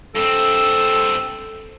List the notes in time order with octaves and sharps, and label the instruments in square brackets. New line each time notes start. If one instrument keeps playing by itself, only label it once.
[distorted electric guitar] G2 C4 [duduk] A4